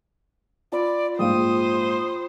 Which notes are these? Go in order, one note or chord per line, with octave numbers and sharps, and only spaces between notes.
F4 D5 B5 E6
A#1 G#2 C5 F5 G5 D#6